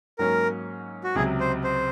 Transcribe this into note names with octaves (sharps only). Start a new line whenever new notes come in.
G#2 F#3 A#3 C#4 A#4
F#4
C#2 C3 F#3 G#4
C5
C5